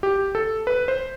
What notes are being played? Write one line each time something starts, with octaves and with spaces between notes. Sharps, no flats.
G4
A4
B4
C5